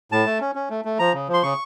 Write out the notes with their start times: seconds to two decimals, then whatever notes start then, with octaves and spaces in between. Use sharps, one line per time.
0.12 A2 A5
0.26 A3
0.41 C#4
0.55 C#4
0.70 A3
0.85 A3
0.99 F3 A#5
1.14 C#3
1.28 F3
1.34 C6
1.43 C#3 C#6